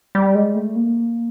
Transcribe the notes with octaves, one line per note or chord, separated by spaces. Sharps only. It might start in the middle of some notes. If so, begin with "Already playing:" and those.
G3
G#3
A3
A#3